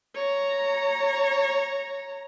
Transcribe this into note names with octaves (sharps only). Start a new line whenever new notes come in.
C#5 A#5